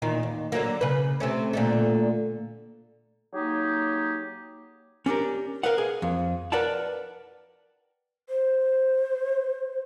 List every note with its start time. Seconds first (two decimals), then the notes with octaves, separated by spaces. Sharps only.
0.02 E2 A#2 D#3
0.23 D#2
0.52 D3 F#3 A#3
0.81 C#3 B4
1.20 C3 A3 C#4
1.53 A#2 D3 A3
3.33 F#3 A#3 D#4 G4 G#4
5.06 C#4 D4 G4 A#4
5.63 A#4 B4 D#5 F5 F#5
5.78 G#4
6.02 F2
6.52 A#4 B4 D5 F#5 G5 A5
8.29 C5